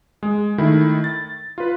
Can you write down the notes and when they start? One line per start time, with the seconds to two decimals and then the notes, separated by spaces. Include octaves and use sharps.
0.23 G#3
0.58 D#3 A3 E4
1.04 A6
1.58 F4 B4